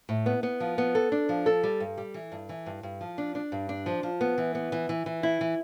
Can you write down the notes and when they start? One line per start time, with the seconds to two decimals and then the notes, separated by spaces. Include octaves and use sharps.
0.09 A2
0.26 B3
0.43 B3
0.60 F3
0.78 B3
0.95 A4
1.12 D4
1.29 F3
1.46 A4
1.63 G3
1.80 G2
1.98 G3
2.14 E3
2.32 G2
2.49 E3
2.66 G2
2.83 G2
3.01 F3
3.18 D4
3.35 D4
3.52 G2
3.69 D4
3.86 F3
4.03 F3
4.21 B3
4.38 E3
4.55 B3
4.72 E3
4.89 E3
5.06 E3
5.23 E4
5.41 E3